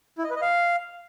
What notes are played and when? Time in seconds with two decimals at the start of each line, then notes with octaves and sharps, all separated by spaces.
0.18 E4
0.24 D#5
0.30 B4
0.36 D#5
0.42 F5